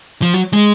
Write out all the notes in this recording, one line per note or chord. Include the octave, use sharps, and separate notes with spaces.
F3
F#3
G#3